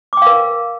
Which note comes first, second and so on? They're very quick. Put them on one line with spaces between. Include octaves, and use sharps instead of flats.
D6 G5 F5 A#4